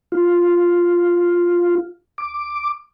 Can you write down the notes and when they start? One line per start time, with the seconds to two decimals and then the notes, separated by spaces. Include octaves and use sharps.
0.12 F4
2.18 D6